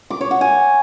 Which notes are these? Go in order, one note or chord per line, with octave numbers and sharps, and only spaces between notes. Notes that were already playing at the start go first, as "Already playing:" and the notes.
D6
C#5
F#5
G#5